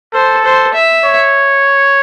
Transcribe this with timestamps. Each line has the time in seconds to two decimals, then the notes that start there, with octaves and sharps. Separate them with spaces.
0.13 A4 C5
0.45 C5
0.74 E5
1.05 C#5